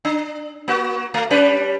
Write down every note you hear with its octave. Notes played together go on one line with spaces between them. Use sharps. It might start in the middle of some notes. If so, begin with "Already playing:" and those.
D4
A#3 F#4
A3
G3 C#4 B4